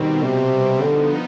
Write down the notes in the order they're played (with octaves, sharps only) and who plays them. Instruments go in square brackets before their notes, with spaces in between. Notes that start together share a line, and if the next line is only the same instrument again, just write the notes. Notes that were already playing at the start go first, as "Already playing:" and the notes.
Already playing: [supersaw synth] B2 G3 C4 [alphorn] D#3
[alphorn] C3
[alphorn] D3 [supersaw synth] F3 B3 D#4